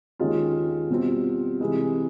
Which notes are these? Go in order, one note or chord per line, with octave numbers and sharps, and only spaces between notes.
D#2 D#3 G#3 C#4 F4
B2 G3 C4 F4
C3 E3 G#3